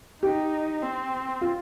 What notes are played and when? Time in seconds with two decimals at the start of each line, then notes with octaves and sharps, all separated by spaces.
0.22 D#4 G4
0.82 C4
1.41 F4